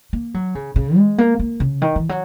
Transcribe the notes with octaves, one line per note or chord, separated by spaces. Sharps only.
A#3
F#3
C#3
C#3
G#3
A#3
A#3
C#3
D#3
E3
F#3